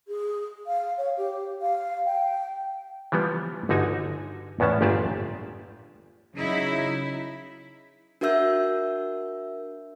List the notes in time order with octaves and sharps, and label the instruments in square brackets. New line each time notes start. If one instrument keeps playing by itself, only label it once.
[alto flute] G#4
F5
C#5
G4
F5
G5
[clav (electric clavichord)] E3 F3 G3 B3
G1 D3 D#4 F#4 G#5
E2 A2 B3 C#4 A5
G1 A#2 G4 G#4 D5 A5
[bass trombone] C#3 [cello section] F#3 D#4 E4
[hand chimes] D4 F#4 A#4 E5 E6 G6